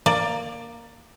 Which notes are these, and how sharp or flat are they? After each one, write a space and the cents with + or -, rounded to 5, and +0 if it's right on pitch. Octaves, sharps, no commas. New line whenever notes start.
A#3 +0 D5 +15